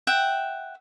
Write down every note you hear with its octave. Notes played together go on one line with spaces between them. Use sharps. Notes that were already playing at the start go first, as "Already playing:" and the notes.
E5 F#5 G5